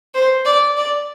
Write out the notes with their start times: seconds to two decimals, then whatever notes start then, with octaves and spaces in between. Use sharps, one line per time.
0.14 C5
0.45 D5
0.77 D5